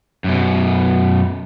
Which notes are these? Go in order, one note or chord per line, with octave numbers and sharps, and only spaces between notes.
F#2 B2